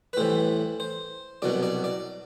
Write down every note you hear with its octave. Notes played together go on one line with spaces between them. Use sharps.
B4
A2 E3 G3 C5
C5
C2 B2 F#3 D5
D5
D5